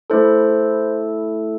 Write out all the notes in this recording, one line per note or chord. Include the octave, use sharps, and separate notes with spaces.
A3 E4 A4 C5